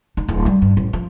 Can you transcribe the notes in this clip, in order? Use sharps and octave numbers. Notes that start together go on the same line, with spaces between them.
D#4
D1
G3
G2
A1
F3